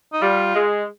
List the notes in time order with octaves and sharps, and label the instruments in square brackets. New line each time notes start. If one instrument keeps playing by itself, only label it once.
[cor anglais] D#4
[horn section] G3 [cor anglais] F4
[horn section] G#3